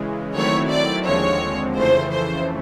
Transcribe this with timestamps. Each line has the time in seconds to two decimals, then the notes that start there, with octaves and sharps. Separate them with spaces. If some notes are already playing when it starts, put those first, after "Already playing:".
Already playing: C#3 E3 G#3
0.33 D#3 F#3 A3 C4 E4 C#5
0.69 D5
1.05 D#2 D3 F3 G#3 C4 C#5
1.77 F2 C#3 E3 A3 C5
2.12 C5